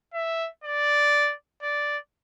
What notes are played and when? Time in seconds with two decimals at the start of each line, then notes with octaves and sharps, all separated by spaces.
0.14 E5
0.64 D5
1.62 D5